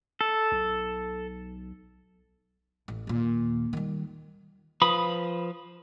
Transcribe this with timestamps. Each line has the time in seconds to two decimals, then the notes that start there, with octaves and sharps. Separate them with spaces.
0.21 A4
0.52 B1
2.88 A1
3.07 D#2 A#2
3.73 D#3 G3
4.82 F3 B4 B5 D#6